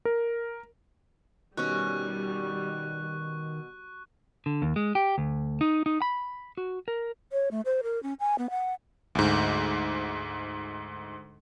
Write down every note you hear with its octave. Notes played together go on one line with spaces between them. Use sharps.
A#4
B2 D#3 G3 C#4 C#6 F#6
D3
D#2
G#3
G4
D2
D#4
D#4
B5
F#4
A#4
C#5
A3
C5
A#4
C#4
G#5
B3
F#5
D2 G#2